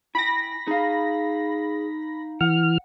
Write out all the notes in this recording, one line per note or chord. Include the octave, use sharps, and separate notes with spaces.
E4 G5 G#5 B5 A#6
D#4 G#4 F5
E3 F#5 F6